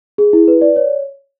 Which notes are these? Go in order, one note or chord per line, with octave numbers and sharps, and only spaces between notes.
G#4
E4
B4
D5
C#5